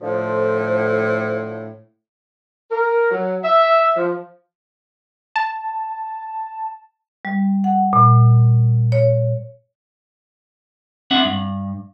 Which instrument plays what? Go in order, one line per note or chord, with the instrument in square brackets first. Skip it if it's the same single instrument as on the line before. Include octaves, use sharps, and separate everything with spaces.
[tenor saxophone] A2 [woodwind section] D3 F3 [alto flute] C5
[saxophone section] A#4
F#3
E5
F3
[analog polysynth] A5
[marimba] G3
F#5
A#2
C#5
[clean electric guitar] C4 D4 E5 F#5
G2